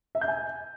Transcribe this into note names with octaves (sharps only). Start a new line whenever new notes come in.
E5
G6
G#5